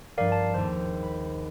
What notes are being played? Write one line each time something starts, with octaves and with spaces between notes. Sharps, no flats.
G2 F3 G3 A#4 D5 F5
A5
G#1 D#2 C5
B5